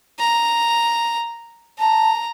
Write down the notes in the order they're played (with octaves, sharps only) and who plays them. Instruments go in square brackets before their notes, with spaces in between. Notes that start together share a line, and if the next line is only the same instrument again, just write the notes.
[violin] A#5
[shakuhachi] A5 [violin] A#5